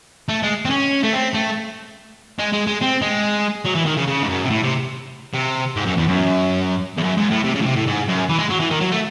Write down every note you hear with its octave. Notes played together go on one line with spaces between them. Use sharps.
A3
G#3
C4
C#4
A3
C4
A3
G#3
G#3
G#3
C4
G#3
F#3
E3
D#3
C#3
C#3
G#2
F#2
C3
A2
C3
C3
G#2
F#2
E2
F#2
E2
F#2
G#2
A2
C3
C#3
A2
C3
A2
G#2
F#2
E3
G#3
F#3
E3
D#3
F#3
A3